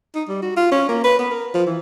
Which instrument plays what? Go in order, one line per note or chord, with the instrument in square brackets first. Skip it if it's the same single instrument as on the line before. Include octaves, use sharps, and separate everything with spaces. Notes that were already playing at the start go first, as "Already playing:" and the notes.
[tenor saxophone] D#4
G3
F#4
F4
C#4
A#3
B4
B3
A#4
F3
E3